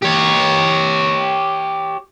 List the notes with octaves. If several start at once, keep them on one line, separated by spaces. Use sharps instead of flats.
G4 C#5